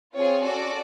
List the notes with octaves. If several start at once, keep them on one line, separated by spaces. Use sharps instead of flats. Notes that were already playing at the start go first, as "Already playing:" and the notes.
C4 F4 G#4 C#5
C#4 F#4 A4 D5